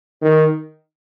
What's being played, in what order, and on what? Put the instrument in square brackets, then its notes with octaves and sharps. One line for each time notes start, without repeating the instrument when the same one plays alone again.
[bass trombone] D#3